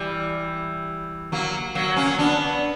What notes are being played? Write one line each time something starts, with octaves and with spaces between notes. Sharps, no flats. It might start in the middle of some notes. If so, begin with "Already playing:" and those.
Already playing: E3 G3
F#3 A#3
F#3 A#3
A#3 C#4
B3 D4